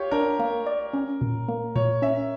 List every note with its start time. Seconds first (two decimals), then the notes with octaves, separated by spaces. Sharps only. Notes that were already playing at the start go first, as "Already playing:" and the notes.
Already playing: F4 G4 C#5
0.11 D4 A#4
0.39 A#3
0.66 D5
0.93 C#4
1.21 A#2
1.48 A#3
1.76 A#2 C#5
2.02 C#4 E5